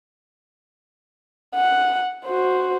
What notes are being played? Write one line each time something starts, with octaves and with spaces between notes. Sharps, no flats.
F#5
F#4 C5